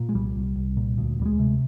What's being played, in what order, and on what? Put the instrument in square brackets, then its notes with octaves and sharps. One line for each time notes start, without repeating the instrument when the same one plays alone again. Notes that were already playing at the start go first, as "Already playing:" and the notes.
Already playing: [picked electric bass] A#2
G#3
C2 G3
C2
C2
A#2
D2
D2 G3
G#3
C3